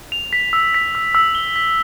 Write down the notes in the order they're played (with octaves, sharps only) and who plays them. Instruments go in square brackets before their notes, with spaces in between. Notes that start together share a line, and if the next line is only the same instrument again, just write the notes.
[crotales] F7
B6
E6
B6
E6
E6
G7
B6